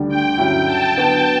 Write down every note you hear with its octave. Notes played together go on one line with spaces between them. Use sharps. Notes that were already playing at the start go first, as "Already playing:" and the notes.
Already playing: D2 D3 G3 D4
G5
G2 D3 F#3 C#4 E4
A5
D3 F#3 B3 F#4